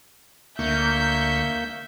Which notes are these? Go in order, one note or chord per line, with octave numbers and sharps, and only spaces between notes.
D2 A#3 E5 C#6 G6